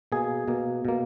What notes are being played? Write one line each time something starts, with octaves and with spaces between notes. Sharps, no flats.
B2 A#3 G#4
B2 A#3
B2 A#3